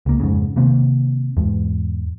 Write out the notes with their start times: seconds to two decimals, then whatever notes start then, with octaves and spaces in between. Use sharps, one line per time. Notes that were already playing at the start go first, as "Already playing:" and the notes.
0.06 C#2 A#3
0.20 F2 G#2 C#3
0.56 C3 D#3 A#3 C4
1.37 E2 G#2